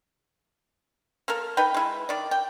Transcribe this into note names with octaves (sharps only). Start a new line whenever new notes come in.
A#3 A4 A#4
D#4 B4 G5
G#3 E4
D#3 D5
G5